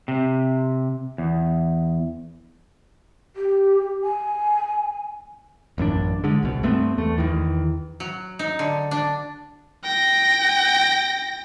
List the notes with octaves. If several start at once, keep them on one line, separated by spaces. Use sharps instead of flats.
C3
E2
G4
G#5
A1 F#2 B3 D4
D3 G#3
C2 B2
G2 A3 B3 C4
E2 A3
E2 D#3 E3
F#3
D#4
D3
D4
G5 A#6